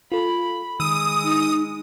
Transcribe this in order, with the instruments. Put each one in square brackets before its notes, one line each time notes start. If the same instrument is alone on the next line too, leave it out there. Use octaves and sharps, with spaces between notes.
[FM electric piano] F4 A4 [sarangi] B5
[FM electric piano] D#3 E6 [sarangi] G#3 [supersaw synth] D#6
[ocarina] D#4